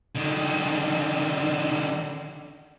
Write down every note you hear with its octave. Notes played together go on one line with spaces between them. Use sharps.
D3 D#3